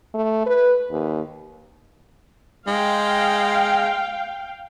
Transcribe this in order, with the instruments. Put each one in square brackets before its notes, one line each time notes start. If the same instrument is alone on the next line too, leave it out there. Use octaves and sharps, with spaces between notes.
[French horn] A3
B4
D#2
[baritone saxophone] G#3 [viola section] F5 G5